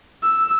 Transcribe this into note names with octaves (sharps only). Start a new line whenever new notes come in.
E6